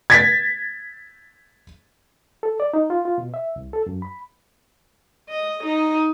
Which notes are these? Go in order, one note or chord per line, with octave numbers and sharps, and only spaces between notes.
G#6 A6 B6
A4
D5
D#4
F4
F4
B2
E5
C2
A4
F#2
B5
D#5
D#4